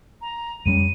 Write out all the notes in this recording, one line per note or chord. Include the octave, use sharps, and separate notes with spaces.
A#5
F2 G3 C#4 D#7